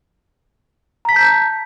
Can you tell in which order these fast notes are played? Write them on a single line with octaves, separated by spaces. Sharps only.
A#5 B6 A5 G6